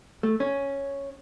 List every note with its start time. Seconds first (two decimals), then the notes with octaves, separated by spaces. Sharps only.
0.23 A3
0.40 C#4